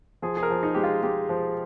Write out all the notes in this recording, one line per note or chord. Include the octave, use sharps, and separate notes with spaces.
F3 G#4
G#4
A#4
F3
D#4
G#3 G4
F4
G#3 G4
F3